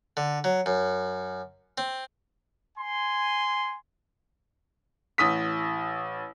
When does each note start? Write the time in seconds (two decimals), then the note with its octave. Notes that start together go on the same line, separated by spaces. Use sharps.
0.17 D3
0.44 F#3
0.66 F#2
1.78 C4
2.78 G#5 C6
5.18 A1 D#6 B6